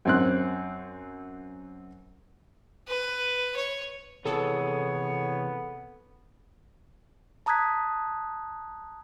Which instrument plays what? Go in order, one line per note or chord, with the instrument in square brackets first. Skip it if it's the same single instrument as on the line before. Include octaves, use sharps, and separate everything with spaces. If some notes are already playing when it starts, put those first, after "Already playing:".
[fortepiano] F#2 C4 F#6
[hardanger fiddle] B4
C#5
[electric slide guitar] C3 E3 G#4 [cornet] B3 [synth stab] A4 [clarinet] C#5
[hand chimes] A5 A#5 D#6 F#6 G#6 B6